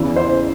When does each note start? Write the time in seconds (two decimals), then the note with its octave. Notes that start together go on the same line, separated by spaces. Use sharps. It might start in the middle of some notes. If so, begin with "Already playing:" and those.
Already playing: E2 C#3 E3
0.16 C5